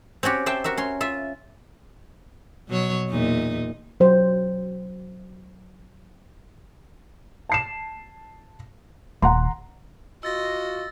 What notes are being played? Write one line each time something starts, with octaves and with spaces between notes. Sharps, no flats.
C4 C#4 F#4 G4
C5 E5 G5 A5
F#4 A#4 E5
C#4 C6
F4 E5
B2 F#3 C#5
E2 A#2 D#4
F#3 C5
A5 C7 E7
D#1 F#5 A#5 C6
F4 F#4 D#5 E6 A6 A#6